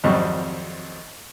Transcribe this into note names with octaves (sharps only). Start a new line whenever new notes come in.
G#1 F2 F#3 G3 C#6